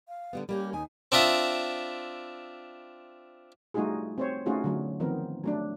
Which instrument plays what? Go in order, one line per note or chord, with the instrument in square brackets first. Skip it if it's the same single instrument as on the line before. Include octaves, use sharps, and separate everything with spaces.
[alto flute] F5
[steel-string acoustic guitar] D3 G3 B3
[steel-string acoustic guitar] G3 A#3 C#4 [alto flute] G4
[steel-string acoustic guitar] D#2 G#5 [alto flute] D#4
[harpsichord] C4 D4 F4 E5 D#6
[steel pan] G3 A3 D#4 F4 F#4 G#4
C4 C5 C#5
A3 C#4 D#4 F4 F#4 G#4
D3 F#3 A3
D#3 F3 B3 C4 A#4
F#3 A3 D4